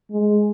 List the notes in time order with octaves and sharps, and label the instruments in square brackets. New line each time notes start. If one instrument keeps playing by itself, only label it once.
[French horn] G#3